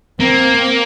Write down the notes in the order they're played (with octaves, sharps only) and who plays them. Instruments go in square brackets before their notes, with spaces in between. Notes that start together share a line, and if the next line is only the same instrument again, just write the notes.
[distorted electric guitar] A#3 [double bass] C4